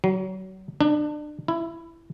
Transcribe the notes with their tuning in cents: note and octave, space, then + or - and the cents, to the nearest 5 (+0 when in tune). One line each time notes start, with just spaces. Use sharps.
F#3 +30
D4 +30
E4 +15